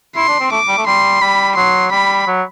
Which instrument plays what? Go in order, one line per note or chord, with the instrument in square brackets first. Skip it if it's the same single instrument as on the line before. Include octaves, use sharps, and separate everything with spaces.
[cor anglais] E4 [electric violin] C6
[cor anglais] D4
C4
[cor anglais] A3 [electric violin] D6
[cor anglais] G3
A3
[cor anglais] G3 [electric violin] C6
[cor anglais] G3 [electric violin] B5
[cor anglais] F#3 [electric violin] C6
[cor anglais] G3 [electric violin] B5
[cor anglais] F#3